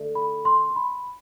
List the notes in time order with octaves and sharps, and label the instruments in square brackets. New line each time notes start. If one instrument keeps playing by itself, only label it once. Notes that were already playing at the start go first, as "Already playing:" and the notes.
Already playing: [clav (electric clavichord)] D3 A3
[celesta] B5
C6
B5